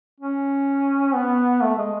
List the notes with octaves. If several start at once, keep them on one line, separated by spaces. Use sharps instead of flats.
C#4
B3
A3
G#3